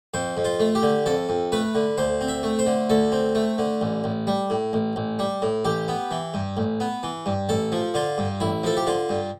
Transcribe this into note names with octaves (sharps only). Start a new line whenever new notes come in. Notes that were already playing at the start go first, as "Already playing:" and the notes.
F2 C5
F2
F4
A3
G4
D3
F2 A4
F2
A3 B4
D3
D2 C5
C4
E5
A3
C5
D3
D2 A4
C4
A3
D3
A1
A1
G3
A2
A1
A1
G3
A2
A1 G4
B3
E3
G2
A1
B3
E3
G2
A1 A4
F3
D3 F4
G2
A1 E4
F3 A4
G4
D3 F4
G2